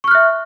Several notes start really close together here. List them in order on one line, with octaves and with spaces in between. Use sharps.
C#6 F6 F#6 E5